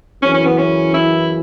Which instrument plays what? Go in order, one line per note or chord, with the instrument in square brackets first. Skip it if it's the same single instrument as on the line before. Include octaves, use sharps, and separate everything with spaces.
[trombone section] F#2 C#3 E3 [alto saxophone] C#4
[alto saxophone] C#4
B3
C#4
E4